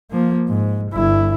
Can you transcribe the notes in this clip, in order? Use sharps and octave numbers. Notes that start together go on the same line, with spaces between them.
F3 A#3
G#2
G1 E4